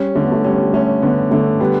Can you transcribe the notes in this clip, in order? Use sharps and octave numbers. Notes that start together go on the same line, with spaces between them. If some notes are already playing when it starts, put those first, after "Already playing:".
Already playing: G3 C#4
D3 A3
B3
A3
G3 C#4
G3
A3 C#4
D3 B3
D3 A3
G3 B3